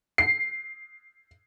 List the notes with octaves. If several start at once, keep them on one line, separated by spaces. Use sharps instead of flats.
C7